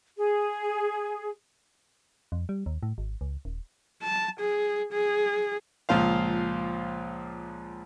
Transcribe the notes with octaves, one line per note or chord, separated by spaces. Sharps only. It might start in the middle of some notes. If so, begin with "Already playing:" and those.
G#4
F2
G3
D#2
A2
G#1
C#2
D#1
A5
G#4
G#4
C#2 A#2 F3 C5 F5